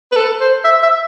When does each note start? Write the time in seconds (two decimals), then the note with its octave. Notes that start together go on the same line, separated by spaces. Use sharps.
0.12 B4
0.16 A4
0.41 C5
0.64 E5
0.83 E5